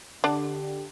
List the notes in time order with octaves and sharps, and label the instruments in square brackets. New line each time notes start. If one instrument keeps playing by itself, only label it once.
[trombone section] D3 G4 [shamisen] D4 D5 F#5